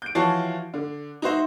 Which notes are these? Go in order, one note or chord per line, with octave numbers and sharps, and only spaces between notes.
G6 D7
E3 F3 F#4 C#5 A5 C7
D3
D#4 F#4 C5 E5